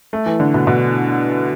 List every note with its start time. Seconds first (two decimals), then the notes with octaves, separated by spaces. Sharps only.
0.13 A3
0.26 E3
0.40 D3
0.54 B2
0.67 B2